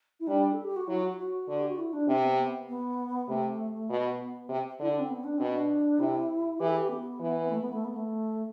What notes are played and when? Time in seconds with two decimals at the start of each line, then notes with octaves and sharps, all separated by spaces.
0.20 E4
0.27 G3 D4
0.53 A4
0.64 G4
0.76 F#4
0.88 F#3 E4
1.03 F#4
1.18 F#4
1.48 D3
1.60 G4
1.69 F#4
1.78 E4
1.93 D4
2.08 C3 C4
2.24 B3
2.38 B3
2.69 B3
3.28 C3 A3
3.89 B2 B3
4.49 C3
4.80 D3 E4
4.91 D4
4.99 C4
5.10 B3
5.24 D4
5.38 B2 C4
5.51 D4
5.99 C3 E4
6.60 E3 G4
6.68 A4
6.77 G4
6.90 B3
7.20 E3
7.51 A3
7.62 B3
7.73 A3
7.84 B3
7.96 A3